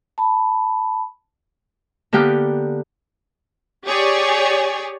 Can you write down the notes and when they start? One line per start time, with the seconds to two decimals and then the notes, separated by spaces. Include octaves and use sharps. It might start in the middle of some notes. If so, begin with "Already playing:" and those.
0.18 A5 B5
2.13 D3 A#3 B3 G4 G5 F6
3.85 G4 G#4 C#5 D5